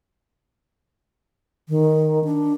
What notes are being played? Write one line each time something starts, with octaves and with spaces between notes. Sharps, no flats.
D#3
D4